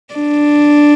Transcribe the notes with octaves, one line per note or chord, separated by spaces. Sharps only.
D4